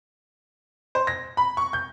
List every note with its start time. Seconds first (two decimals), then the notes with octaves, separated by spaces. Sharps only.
0.95 C5
1.07 A#6
1.37 B5
1.57 C#6
1.73 G6